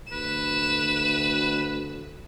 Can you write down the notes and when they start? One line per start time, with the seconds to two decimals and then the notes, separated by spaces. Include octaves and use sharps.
0.12 D2 B4 E7